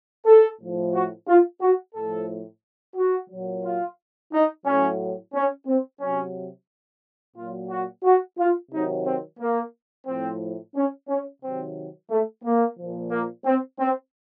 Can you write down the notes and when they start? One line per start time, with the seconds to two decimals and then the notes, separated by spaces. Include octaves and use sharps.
0.26 A4
0.61 A2 F3
0.93 F#4
1.28 F4
1.61 F#4
1.95 A2 F3 A4
2.96 F#4
3.30 A#2 F#3
3.64 F4
4.33 D#4
4.65 A2 F#3 C#4
5.34 C#4
5.67 C4
6.01 C3 F#3 C#4
7.36 A#2 F#3 F4
7.70 F#4
8.04 F#4
8.39 F4
8.71 C3 D#3 F#3 D#4
9.06 C4
9.39 A#3
10.07 A2 F3 C4
10.75 C#4
11.09 C#4
11.42 C3 D#3 F#3 C4
12.10 A3
12.44 A#3
12.78 A#2 F3
13.11 A#3
13.45 C4
13.79 C4